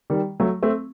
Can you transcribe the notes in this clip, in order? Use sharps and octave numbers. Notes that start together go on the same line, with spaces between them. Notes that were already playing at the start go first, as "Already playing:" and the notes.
D#3 G3
F#3 A3
A3 C4